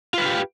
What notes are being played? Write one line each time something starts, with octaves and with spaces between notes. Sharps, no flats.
F4 G4 B4 F5